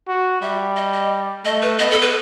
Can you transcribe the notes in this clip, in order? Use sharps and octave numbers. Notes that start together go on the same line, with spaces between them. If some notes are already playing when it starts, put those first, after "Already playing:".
F#4
G3 E5
D#5
D#5
A3 D#5
B4
B3 D#5
A4
B4